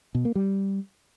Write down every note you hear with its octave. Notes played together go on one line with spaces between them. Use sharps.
B2
A#3
G3